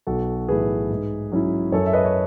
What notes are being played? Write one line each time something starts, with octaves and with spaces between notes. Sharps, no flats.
B1 F#4 A4
A2 E3 G#4 B4
G#2
F#3 C#4 E4
F#2 A4 C#5
E5
B4 D#5
C#5